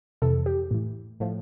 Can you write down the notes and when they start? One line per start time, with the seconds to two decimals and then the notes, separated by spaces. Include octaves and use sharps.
0.22 F2 C3 E3 A4
0.46 G4
0.71 A2 E3
1.20 A2 F3